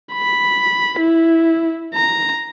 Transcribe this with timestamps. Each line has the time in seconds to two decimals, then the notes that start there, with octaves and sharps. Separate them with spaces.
0.13 B5
1.00 E4
1.94 A#5